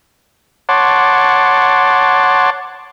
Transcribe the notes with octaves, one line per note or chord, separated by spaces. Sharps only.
C#5 F#5 A5 C6 D6